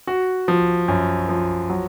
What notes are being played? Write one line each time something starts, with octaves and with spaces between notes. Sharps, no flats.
F#4
F3
F#2
F3
F#3